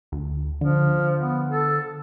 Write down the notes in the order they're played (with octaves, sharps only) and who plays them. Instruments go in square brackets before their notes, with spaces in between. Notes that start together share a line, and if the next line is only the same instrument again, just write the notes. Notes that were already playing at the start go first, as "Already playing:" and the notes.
[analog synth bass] D2
[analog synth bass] D3 [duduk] F3
[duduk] B3
A4